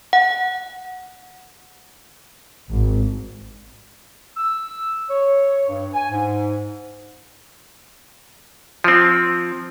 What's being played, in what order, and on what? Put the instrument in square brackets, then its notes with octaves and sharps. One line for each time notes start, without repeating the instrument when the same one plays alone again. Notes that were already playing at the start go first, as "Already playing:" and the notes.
[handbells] F#5
[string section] G#1
[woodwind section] E6
C#5
G2
G#5
G#2
[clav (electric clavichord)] F3 C4